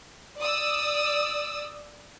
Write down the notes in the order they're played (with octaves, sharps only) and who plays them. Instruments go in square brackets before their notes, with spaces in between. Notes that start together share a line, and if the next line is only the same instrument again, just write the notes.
[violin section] D5 D#6 E6